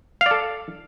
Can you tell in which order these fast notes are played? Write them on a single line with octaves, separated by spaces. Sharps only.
F5 D5 A4